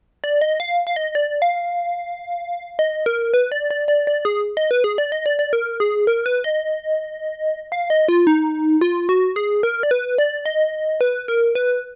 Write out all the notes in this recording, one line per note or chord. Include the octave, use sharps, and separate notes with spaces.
D5
D#5
F5
F5
D#5
D5
F5
D#5
A#4
B4
D5
D5
D5
D5
G#4
D#5
B4
G#4
D5
D#5
D5
D5
A#4
G#4
A#4
B4
D#5
F5
D#5
F4
D#4
F4
F#4
G#4
A#4
D5
B4
D5
D#5
B4
A#4
B4